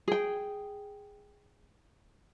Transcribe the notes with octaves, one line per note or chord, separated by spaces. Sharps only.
G#4 G5